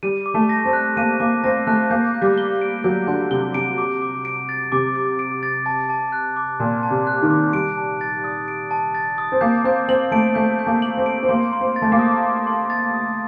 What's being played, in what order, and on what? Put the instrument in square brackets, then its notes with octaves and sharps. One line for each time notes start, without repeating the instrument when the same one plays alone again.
[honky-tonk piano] G3 [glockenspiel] D#7
[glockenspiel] D6
[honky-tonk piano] A3
[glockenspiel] A#6
[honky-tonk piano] C4
[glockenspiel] F#6
[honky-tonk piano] A#3 [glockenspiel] D#7
[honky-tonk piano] A#3 [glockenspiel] D6
[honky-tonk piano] C4 [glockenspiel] A#6
[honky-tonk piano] A3 [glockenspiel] F#6
[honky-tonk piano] A#3 [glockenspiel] G6
[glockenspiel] G6
[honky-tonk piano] G3
[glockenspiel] G7
D7
[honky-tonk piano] F#3 [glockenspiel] G6
[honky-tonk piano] D3 [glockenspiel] G6
[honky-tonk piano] C3 [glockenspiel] G7
[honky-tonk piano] C3 [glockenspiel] D7
[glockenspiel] D6
D6
D7
A6
[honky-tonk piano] C3 [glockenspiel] D6
[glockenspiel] D6
D7
A6
A5
A5
F#6
D6
[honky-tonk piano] A#2 [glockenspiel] A5
[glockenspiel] A5
[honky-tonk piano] C3
[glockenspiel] F#6
[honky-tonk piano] D#3
[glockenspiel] D6
[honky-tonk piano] G3 [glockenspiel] D7
[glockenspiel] A5
A6
D#6
D7
A5
A6
D#6
[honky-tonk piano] C4
[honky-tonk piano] A#3 [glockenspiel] G6
[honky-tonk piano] C4 [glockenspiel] G6
[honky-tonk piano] C4 [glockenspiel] F#7
[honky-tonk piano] A3 [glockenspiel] D7
[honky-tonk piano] A3 [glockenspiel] G6
[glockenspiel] G6
[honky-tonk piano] A#3
[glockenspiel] F#7
[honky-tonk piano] C4
[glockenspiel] D7
[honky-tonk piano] C4
[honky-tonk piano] A#3 [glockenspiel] C6
[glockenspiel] C6
[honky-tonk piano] C4
[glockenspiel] A6
[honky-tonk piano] A3
A#3
[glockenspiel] D#6
C6
C6
A6
D#6